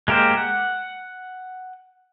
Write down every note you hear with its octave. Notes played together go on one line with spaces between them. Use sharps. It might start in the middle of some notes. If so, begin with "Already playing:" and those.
G#3 A#3 G4 A#4 C5
F#5